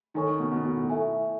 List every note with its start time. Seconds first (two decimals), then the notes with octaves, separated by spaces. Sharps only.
0.14 D#3 D#4 A4 C#5 G#5 C#6
0.40 B2
0.52 B2
0.65 B2
0.77 A2
0.90 A4 E5 G#5